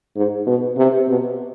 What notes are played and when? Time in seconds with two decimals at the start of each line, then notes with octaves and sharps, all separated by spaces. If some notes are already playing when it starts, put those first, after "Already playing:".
0.16 G#2
0.47 B2
0.77 C3
1.08 B2